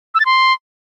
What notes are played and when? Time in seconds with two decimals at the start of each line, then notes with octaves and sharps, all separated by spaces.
0.15 E6
0.20 A6
0.25 C6